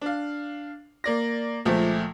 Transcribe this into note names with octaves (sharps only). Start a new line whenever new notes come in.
D4 F5
A#3 D5 A#6
C#2 A#2 F3 A3